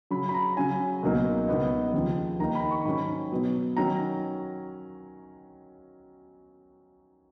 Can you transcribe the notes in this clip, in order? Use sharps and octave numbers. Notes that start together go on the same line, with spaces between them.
C#3 F#3 C#4 B5
B5
A#5
C#3 F#3 C#4 G#5
C#2 B2 F#3 A#3 D#4
C#2 B2 F#3 B3 D#4
D#2 C#3 F3
D#2 D#3 A#3 D#4 A#5
B5
C#6
G#2 D#3 F#3 C#4 B5
B2 F#3 B3
D#3 F#3 C#4 A#5